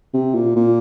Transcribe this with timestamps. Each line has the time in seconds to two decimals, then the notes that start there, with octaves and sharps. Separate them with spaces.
0.14 C3
0.35 A#2
0.56 A#2